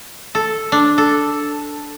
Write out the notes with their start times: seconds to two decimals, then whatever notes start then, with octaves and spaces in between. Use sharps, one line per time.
0.35 A4
0.72 D4
0.98 A4